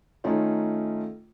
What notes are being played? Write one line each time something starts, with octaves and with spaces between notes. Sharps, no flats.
D#3 A3 C#4 D#4 F4